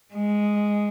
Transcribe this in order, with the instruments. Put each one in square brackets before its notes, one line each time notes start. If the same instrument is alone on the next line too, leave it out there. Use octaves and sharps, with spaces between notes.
[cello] G#3